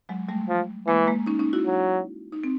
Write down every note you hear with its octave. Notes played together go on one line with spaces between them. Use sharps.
F#3 G#3
G3 A3
F3
E3 G#3 A#3
G#3 A#3
C#4 D#4
C#4 D#4
E4 F#4
F#3
D#4
C4